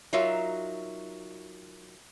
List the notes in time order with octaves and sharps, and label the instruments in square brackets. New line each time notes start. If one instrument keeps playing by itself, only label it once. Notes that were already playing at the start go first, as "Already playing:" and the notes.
[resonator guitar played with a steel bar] F#3 D#4 F4 A#4 E5